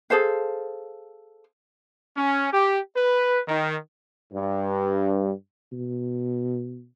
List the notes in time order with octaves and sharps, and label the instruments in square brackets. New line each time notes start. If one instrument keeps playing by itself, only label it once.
[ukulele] G#4 A4 C5 F5
[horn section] C#4
G4
B4
D#3
[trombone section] G2
[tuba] B2